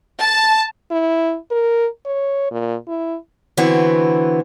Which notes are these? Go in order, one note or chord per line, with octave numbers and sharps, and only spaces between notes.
A5
E4
A#4
C#5
A#2
E4
D3 E3 B3 C4 F#4